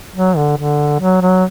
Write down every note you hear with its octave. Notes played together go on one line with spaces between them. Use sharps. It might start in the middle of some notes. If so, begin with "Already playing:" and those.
F#3
D3
D3
F#3
F#3